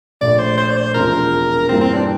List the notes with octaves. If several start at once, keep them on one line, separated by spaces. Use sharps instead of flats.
A#1 A#2 A3 D5
C5
C5
D5
C5
E1 E2 C3 F3 A#4
G2 E3 G3 A#3 C4
C4
D4